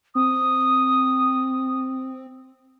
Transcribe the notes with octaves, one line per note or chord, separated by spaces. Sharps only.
C4 D#6